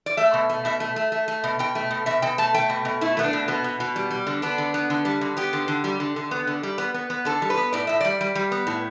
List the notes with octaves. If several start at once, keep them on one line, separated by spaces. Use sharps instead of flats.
D5
A3 E5
B2
A3
B2 E5
A3
A3
A3
A3
B2
B2 G5
A3
B2
B2 E5
B2 G5
A3 A5
A3 G5
B2
B2
A3 E4
A3 B3
D4
B2
B2 B3
B2
B2
G3
G3
D3
B3 D4
D3
B3
D3
G3
D3
B3 G4
D3
D3
G3
D3
D3
B3
D3
G3
B3
B3
B3
D3 A4
G3
B4
B3
A2 D5
A2 E5
G3 D5
G3
G3
B3
A2